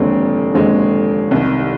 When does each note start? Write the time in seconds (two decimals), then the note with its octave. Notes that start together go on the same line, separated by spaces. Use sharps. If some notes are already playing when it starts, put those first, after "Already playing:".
Already playing: F1 D#2 D3 G#3 C4
0.54 F1 D#2 D3 G#3 C4
1.31 C2 C3 D#3